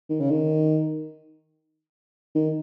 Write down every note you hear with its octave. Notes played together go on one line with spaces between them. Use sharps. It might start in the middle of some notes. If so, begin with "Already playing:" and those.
D#3
C#3
D#3
D#3